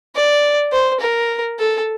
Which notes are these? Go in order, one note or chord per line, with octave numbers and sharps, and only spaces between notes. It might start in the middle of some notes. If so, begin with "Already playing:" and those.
D5
C5
A#4
A4